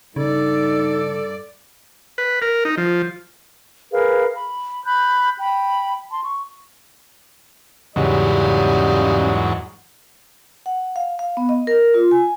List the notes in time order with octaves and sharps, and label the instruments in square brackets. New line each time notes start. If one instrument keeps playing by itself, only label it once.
[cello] G2 D5 [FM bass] C#3 [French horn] D#4 [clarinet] A4
[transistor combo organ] B4
A#4
D#4
F3
[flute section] G#4 A#4 B4 F5
B5
B5 F#6 G6
G5 B5
A5 C6
C#6
[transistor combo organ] E2 G#2 F#3 [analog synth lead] C#3 [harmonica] G3 D#5
[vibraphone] F#5
F5
F5
B3
D#5
A#4
F4
G#5